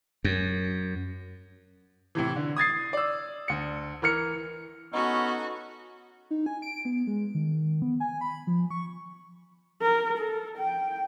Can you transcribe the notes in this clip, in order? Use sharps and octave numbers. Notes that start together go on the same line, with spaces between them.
F#2
A2 C3 E3
D3
D#6 G#6 A6 C7
D5 E6
D2 C#7
E3 A#4 F6 C#7
B3 C#4 D#4 F#4 A4
D#4
G#5
D7
B3
G#3
D#3
B3
G#5
B5
F3
C#6
A#4
A4
G5